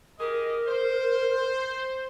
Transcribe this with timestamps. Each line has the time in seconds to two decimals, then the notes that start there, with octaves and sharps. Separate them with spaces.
0.19 G4 G#4 A#4 D#5
0.67 C5